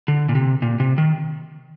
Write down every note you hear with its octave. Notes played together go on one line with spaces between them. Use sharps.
D3
A#2
C3
A#2
C3
D#3